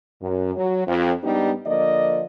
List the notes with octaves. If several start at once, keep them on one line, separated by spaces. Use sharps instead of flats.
F#2
F#3
F2
G#2 G3 B3 D4 D#4 G4
D3 F3 A#3 D5 D#5